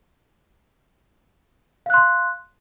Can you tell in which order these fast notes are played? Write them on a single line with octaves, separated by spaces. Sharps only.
F5 F#6 C6